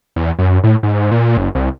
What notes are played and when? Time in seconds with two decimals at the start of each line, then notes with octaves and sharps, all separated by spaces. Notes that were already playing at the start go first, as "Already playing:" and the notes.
0.16 E2
0.39 F#2
0.64 A2
0.83 G#2
1.11 A#2
1.37 F#1
1.55 C2